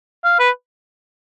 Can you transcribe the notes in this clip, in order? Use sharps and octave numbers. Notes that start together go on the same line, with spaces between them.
F5
B4